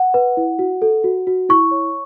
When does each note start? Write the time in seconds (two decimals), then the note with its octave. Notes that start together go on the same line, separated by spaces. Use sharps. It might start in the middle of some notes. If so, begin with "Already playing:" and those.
Already playing: F#5
0.14 B4
0.37 E4
0.59 F#4
0.82 A4
1.04 F#4
1.27 F#4
1.49 E4 C#6
1.71 C#5